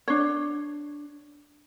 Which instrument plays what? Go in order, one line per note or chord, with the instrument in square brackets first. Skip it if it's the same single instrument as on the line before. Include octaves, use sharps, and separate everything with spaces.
[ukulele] D4 C#5